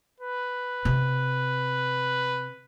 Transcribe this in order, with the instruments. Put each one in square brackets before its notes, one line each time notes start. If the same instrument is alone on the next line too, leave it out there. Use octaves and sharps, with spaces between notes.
[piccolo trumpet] B4
[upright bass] C3